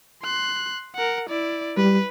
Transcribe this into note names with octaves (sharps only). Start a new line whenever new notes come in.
C6 F#6
A#4 F#5
E4 D5
G3 B4